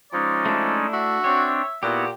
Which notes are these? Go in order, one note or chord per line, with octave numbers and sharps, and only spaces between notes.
F3 G#3 C#4 D#4 D5
A3 D4 E4
F#4 E5
C4 D4 C#5
A#2 B3 E4 F#4 G4